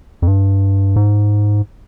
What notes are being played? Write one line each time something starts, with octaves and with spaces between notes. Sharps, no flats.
F2
G2
G#2